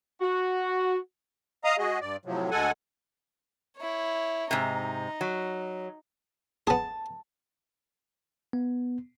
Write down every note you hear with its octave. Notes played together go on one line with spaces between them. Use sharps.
F#4
D#5 F5 A#5 D#6
G#3 F#4 G#4 D#5
G2 D5
A2 C3 F3 F#3
D2 G#3 A4 F#5 G#5
E4 C#5
G#2 C3 D#4
F#3
B3 G#4 A5
B3